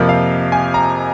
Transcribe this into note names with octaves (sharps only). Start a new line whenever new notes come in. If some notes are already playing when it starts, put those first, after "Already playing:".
Already playing: F2 C3 F3 A#3
F5
G#5
A#5